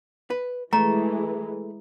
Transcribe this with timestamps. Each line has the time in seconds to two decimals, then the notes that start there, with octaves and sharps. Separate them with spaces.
0.30 B4
0.73 E3 G#3 A3 A#5